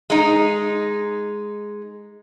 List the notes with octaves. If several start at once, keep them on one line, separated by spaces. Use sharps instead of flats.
G#3 D#4